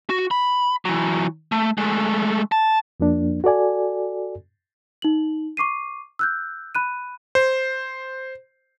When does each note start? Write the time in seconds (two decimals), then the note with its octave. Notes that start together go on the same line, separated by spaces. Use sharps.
0.10 F#4
0.31 B5
0.85 E3 F#3
1.52 A3
1.78 G#3 A3
2.52 A5
3.00 F2 F3 A#3 D4
3.44 F#4 A4 D5 G#5
5.02 D#4 F#7
5.57 C#6 D6 C7 D#7
6.19 E6 F#6 G6
6.75 B5 F#6 D#7
7.35 C5